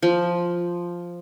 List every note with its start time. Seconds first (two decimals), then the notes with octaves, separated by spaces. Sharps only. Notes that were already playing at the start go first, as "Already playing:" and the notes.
0.03 F3